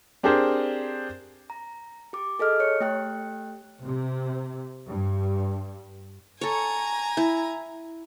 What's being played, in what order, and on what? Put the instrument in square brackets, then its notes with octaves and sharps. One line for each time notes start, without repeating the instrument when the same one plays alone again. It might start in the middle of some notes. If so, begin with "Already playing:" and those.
[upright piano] C4 D4 G4 G#4 A#4 C5
[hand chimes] A#5
G4 D6
G#4 A4 D#5 F6
C#5 C#7
A3 G4 G5 F#6
[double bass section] C3
G2
[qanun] A4 C#5 [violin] G#5 A#5
[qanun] E4